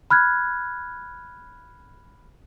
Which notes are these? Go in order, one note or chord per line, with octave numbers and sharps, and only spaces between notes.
B5 F6 F#6 G#6